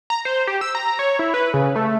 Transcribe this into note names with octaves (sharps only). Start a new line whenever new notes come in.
A#5
C5
G4
E6
A#5
C#5
E4
B4
C#3
A3